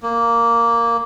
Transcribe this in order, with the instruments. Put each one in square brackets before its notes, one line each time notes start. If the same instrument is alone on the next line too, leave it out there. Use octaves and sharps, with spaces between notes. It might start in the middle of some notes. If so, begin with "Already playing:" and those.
[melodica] A#3